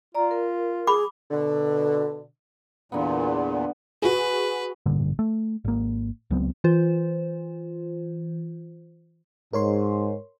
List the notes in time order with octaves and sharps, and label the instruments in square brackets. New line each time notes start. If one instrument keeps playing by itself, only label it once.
[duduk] F4 [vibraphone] D5 A#5
[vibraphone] A#4
[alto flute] G#4 [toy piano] B5 D6
[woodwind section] B2 D3
[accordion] E2 A#2 [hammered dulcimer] D3 A#3 B3
[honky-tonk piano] F#4 G#4 [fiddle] B4
[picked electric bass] A1 G2 A#2 D3
A3
G#1 A#3
C#2 F#3 B3 C4
[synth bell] E3 F4 C5
[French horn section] G#2 [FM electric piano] A#4 C#5 C6